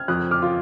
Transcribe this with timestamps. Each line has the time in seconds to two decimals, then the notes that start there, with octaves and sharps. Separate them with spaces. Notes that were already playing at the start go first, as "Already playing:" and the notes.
Already playing: F6 G#6
0.08 F2 D#6 F#6
0.31 D6 F6
0.42 F4